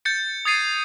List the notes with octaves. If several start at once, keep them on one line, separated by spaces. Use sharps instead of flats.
G6 A6 C#7
D#6 G#6 A6 C7 D#7